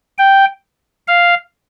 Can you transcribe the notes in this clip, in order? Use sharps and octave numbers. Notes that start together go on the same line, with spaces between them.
G5
F5